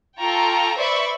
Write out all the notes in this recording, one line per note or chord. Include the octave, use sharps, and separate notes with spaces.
F4 A4 G5 A#5 C#6
B4 C5 D5 E5 B5 C#6